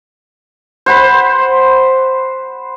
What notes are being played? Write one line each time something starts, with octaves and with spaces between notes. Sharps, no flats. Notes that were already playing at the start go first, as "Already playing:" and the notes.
C5 F#5 B5